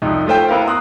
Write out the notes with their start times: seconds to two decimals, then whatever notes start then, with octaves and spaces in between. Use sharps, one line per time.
0.02 C2 F2 D#4
0.26 A3 F4 C5 G5
0.48 B3 E4 A#4 F5
0.65 A#5 C6 D#6 F#6